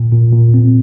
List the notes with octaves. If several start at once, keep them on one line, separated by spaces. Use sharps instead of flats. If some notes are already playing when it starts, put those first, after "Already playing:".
Already playing: A#2
A#2
A#2
C4